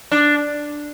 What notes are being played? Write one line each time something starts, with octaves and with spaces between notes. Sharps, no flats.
D4